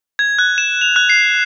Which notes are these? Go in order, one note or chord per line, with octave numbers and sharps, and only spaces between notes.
G#6
F#6
E7
F7
F#6
C7